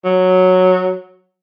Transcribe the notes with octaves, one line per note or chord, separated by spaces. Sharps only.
F#3